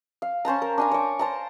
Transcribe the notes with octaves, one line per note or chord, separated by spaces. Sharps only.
F5
C#4 C5 A5 A#5
A#4
D4 G#5 A#5
C#5 D6
C5 A5 A#5